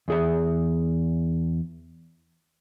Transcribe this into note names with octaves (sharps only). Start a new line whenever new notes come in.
E2 G#4 E5